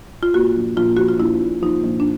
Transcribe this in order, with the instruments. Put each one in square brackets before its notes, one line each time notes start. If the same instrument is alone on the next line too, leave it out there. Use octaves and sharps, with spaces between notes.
[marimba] F4
[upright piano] A#2 [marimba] F#4
[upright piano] A#1
[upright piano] A#1 [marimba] F4
[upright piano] F3 [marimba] F#4
[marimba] F4
[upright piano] A#1 [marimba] E4
[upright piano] A#2
[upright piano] F3 [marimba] D#4
[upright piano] A#1
[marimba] D4